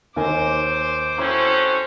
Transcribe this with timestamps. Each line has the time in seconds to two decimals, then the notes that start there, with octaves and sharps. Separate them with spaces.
0.16 D#2 A#4 C5 G#5 D6
1.18 A3 C4 C#4 E4 F#4 C5 C6